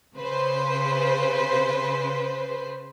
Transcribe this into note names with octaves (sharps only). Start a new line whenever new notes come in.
C#3 B4 C5